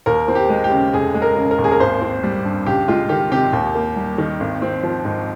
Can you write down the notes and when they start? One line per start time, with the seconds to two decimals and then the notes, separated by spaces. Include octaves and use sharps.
0.06 D#2 A#4
0.28 C4
0.35 G4
0.49 G#3
0.64 G4
0.71 C#3
0.93 F1 G#4
1.14 G#3
1.22 A#4
1.36 C#3
1.51 A#4
1.58 D#2
1.64 G#4
1.71 A#4
1.80 G#1 C5
2.01 C4
2.23 G3
2.45 G2
2.66 C#2 G4
2.88 G#3 F4
3.09 D#3 G4
3.32 C3 G4
3.53 D#2
3.75 A#3
3.96 G3
4.18 D#3
4.40 G#1
4.62 C4
4.83 F3
5.05 G#2